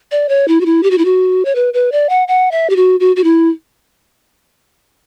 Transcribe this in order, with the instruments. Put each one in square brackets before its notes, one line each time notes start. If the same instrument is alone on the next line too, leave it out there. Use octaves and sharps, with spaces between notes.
[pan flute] D5
C#5
E4
F#4
E4
G4
F#4
E4
F#4
C#5
B4
B4
D5
F#5
F#5
E5
G4
F#4
F#4
F#4
E4